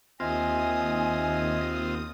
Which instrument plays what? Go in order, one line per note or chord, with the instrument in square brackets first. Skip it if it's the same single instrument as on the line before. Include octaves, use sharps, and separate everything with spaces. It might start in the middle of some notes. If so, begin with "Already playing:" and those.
[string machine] D#2 D#6 [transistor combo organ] C4 F4 [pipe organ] D#5 E5 G#6 [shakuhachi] G#5